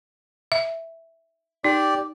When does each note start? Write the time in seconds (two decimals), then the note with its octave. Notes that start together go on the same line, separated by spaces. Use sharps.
0.52 E5
1.64 D#4 G4 D5